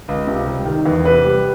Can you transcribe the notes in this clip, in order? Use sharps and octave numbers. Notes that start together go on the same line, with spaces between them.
C#2
C3
G3
D#3
E2
C3 B4
G3